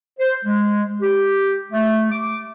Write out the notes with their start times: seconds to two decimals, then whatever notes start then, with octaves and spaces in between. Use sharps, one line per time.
0.20 C5
0.45 G#3
1.01 G4
1.72 A3
2.12 D6